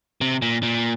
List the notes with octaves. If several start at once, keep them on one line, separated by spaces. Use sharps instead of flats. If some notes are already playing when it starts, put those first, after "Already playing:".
C3
A#2
A#2